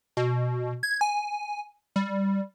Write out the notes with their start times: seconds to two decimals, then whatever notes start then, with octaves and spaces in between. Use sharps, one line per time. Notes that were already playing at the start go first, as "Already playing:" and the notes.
0.17 B2
0.83 G#6
1.01 G#5
1.96 G3